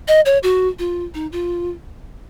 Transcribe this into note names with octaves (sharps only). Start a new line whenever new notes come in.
D#5
C#5
F#4
F4
D#4
F4